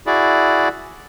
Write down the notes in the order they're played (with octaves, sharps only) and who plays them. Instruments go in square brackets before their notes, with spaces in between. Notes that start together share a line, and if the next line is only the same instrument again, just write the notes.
[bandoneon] E4 F#4 G#4 D5